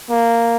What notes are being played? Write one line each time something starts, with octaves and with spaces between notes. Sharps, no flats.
A#3